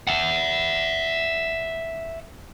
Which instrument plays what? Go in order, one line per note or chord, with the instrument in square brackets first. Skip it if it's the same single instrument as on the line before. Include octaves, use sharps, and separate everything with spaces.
[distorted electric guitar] E5 F#5